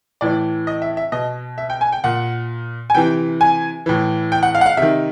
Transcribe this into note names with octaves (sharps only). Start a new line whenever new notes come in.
A2 E3 D5
D#5
E5
E5
B2 D#5
E5
G5
G#5
G5
A#2 F#5
G#5
C3 E3 G5
G#5
A2 E3
G5
F#5
F5
F#5
F5
C3 D#3 E5